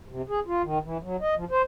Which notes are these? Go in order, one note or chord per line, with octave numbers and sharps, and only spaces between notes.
C3
G#4
F4
D#3
E3
F#3
D#5
F3
C5